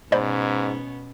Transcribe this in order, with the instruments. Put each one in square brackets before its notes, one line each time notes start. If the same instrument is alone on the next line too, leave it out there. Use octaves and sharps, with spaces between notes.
[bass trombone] G#2 [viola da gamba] B2 B3 C#4 [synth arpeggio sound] C5 D5 B5